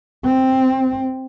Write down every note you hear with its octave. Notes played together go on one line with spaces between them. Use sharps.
C4